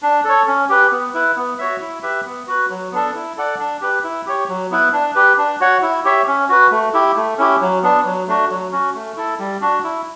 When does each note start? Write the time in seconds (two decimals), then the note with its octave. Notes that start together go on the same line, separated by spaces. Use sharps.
0.03 D4
0.24 A4 C#5
0.47 C#4
0.69 G4 B4
0.92 B3
1.14 E4 B4
1.36 B3
1.59 F#4 C#5 E5
1.81 E4
2.03 G4 B4 E5
2.25 B3
2.48 F#4 B4
2.70 F#3
2.92 B3 D4 A4
3.15 E4
3.37 A4 D5 F#5
3.59 D4
3.81 G4 B4
4.04 E4
4.27 G4 C#5
4.49 F#3
4.71 B3 E4 B4
4.93 D4
5.15 G4 B4
5.38 D4
5.60 F#4 C#5 F#5
5.82 E4
6.05 G4 C#5 E5
6.27 C#4
6.49 F#4 B4
6.71 A3
6.94 E4 G4
7.16 A3
7.38 C#4 E4 G4
7.61 F#3
7.83 B3 D4
8.05 F#3
8.28 A3 D4 F#4
8.50 F#3
8.72 C#4 F#4
8.95 A3
9.17 E4 A4
9.39 G3
9.61 D4 F#4
9.84 E4